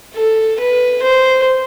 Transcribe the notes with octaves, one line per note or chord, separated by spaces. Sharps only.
A4
B4
C5